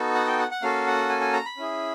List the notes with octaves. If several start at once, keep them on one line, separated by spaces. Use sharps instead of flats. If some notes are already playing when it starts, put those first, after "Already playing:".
Already playing: B3 D#4 F#4 A4
F#5
G5
F#5
F#5
A#3 C#4 F#4 A4 F5
F#5
G#5
G#5
A#5
B5
C#4 E4 G#4